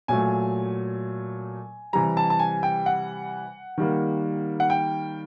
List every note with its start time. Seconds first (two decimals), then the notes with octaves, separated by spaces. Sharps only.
0.08 A#2 F#3 A3 G#5
1.93 C3 E3 G3 A#5
2.17 A5
2.30 A5
2.39 G#5
2.63 G5
2.86 F#5
3.78 D#3 G3 A#3
4.60 F#5
4.70 G5